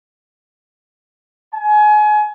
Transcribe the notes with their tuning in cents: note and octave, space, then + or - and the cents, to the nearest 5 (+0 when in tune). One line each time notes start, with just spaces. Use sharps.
G#5 +30